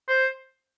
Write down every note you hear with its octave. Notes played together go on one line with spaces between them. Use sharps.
C5